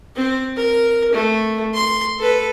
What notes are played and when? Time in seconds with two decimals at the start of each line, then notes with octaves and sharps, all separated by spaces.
0.16 C4
0.57 A#4
1.13 A3
1.74 C6
2.19 A4 B4